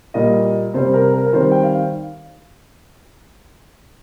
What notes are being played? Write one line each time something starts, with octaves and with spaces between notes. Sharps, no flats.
A#2 G3 A#3 D#5
C3 G3 C4 C5
A#4
A#4
A#4
D#3 G3 C4 C5
G5
F5